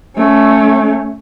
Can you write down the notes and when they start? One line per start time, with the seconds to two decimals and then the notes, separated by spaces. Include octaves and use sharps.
0.17 A3 C#4